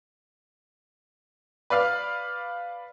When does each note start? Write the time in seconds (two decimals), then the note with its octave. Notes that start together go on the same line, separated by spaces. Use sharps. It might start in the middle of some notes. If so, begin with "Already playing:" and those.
1.70 B4 D5 F5 F6